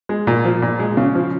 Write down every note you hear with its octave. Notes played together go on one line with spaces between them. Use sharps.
G#3
A#2
F3
A#2
G#3
C#3
F3